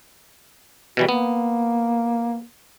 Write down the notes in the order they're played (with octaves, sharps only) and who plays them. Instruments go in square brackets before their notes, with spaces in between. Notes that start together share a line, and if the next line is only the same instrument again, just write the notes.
[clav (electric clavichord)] B2 E3 G3 [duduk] F#4
[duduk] A#3 [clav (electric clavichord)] B3